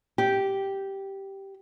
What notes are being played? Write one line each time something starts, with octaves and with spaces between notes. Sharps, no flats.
G4